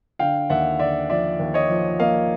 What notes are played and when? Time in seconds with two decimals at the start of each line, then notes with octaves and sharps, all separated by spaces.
0.19 D3 F5 G5
0.50 D#2 E5 F#5
0.79 D3 D5 E5
1.09 F3 D5 E5
1.39 D#2
1.54 C#5 D#5
1.69 F3
1.99 A#3 D#5 F5